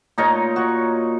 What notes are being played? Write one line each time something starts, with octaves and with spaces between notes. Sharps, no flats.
A#2 D#4 A#4 C#5
F#4 C#5